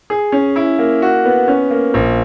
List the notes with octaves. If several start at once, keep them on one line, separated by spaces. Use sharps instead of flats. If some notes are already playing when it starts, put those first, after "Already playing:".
G#4
C#4
E4
A#3
F#4
B3
C#4
A#3
A#1